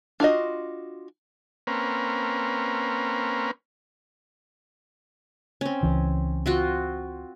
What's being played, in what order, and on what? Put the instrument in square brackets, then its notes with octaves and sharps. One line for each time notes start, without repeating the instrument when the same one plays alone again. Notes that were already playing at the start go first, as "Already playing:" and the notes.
[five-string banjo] D4 F4 F#4 D#5
[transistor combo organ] A#3 C4 C#4 A#4 B4
[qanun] C4 C#4
[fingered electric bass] C#2 E3
[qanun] C4 F4 F#4